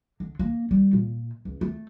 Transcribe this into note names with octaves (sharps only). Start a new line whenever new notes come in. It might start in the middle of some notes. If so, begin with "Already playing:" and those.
D3
A#3
G3
A#2
C#2
A3